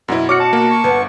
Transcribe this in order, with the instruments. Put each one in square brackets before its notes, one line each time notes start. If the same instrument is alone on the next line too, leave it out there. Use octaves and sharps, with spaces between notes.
[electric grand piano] F#2 E4 [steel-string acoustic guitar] B2 C#4 D#5
[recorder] F#4 [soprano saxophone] C#5 [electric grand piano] D6 F6 C#7
[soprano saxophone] A5
[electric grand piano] A#3
[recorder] C#6
[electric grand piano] G1 [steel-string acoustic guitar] C#4 B4 F#5